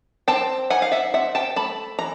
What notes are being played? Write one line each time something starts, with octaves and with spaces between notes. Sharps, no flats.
C4 G5 A5
D#4 F#5 G#5
F5
E5 F#5
C4 E5 F#5
G5 A5
A3 A5 B5
E3 A#5